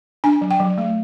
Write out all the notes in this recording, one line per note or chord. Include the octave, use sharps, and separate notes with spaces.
D4 G#5
F#3
G5
F#3
A3